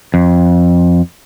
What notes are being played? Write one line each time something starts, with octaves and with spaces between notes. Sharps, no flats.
F2